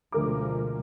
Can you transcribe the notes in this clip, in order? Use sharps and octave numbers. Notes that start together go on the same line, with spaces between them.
D2 B2 F3 G#3 A#4 D6